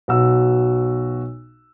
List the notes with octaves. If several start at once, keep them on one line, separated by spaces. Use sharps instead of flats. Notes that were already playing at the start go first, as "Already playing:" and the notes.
B1 F#4 E6